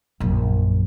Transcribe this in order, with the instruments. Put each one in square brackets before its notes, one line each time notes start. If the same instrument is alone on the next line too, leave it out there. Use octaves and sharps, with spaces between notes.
[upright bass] A#1 F#2